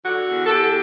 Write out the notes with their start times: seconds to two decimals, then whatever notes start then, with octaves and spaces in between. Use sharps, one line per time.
0.06 D3 F#4
0.29 E2
0.45 A4
0.51 E2 G4